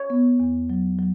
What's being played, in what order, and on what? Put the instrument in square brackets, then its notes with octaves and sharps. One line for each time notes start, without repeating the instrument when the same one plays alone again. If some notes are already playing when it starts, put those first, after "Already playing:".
Already playing: [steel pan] C#5
[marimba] B3
E2
F#3
F#3